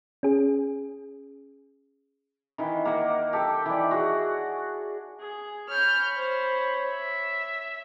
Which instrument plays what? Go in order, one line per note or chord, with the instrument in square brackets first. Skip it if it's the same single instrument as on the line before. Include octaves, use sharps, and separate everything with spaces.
[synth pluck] C#4 G#4
[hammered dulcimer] D#3 E3
A#3 F#5
G4 A4
E3 D5
F#4 G#4
[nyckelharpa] G#4
[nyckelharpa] C#5 B5 [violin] F6 G6
[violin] C5
E5